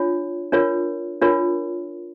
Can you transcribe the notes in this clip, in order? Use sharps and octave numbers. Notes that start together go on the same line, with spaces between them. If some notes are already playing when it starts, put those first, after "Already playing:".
Already playing: D4 F4 C#5
D4 F4 A#4 C#5
D4 F4 A#4 C#5